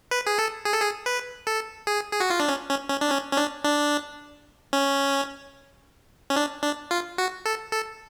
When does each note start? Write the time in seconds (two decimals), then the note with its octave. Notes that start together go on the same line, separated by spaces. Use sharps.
0.11 B4
0.27 G#4
0.38 A4
0.65 G#4
0.73 A4
0.82 G#4
1.06 B4
1.47 A4
1.87 G#4
2.12 G#4
2.20 F#4
2.30 F4
2.40 D4
2.48 C#4
2.69 C#4
2.90 C#4
3.01 D4
3.10 C#4
3.33 C#4
3.37 D4
3.64 D4
4.73 C#4
6.30 C#4
6.36 D4
6.63 D4
6.91 F4
7.18 F#4
7.46 A4
7.72 A4